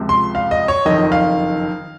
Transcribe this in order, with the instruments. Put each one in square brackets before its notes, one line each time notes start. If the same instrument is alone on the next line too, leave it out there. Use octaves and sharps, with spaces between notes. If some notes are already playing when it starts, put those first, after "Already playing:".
Already playing: [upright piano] C#2 C3 F3
C6
F5
D#5
C#5
F#1 F2 D#3 D#5
F5